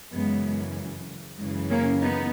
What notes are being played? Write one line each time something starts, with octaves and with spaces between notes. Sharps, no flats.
F#2 C#3 E3 G#3 B3
F#2 C#3 E3 G#3
A#3 C#4
B3 D#4